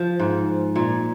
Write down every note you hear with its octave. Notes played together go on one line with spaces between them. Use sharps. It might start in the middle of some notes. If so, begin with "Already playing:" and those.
Already playing: F3
G#2
A#2